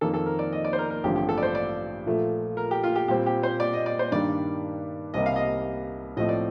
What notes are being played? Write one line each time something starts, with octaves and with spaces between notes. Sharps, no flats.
F2 D#3 A#3 A4
A4
A#4
D5
D#5
D5
C5
A#4
A#4
A1 G2 D3 F3 C4 G4
G4
A4
D5
C5
D5
A#2 F3 A3
A#4
G4
F4
G4
A#2 G3 C4 G4
G4
C5
D5
D#5
D5
C5
G2 D#3 G3 A#3 D4 D5
C2 C3 G3 A#3 D#5
F5
D#5
A2 F3 C4 D#5
D5